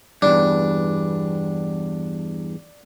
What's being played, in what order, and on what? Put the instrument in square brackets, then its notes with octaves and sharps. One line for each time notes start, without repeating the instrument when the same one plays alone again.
[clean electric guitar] E2 G2 [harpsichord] D4